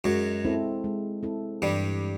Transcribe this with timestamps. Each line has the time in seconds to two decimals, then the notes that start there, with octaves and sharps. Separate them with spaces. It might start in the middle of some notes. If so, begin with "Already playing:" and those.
0.04 F#2 F#3 G#3
0.45 C4 E4 A4
0.84 G#3
1.23 C4 E4 A4
1.62 G2 E3 G3
2.02 G#3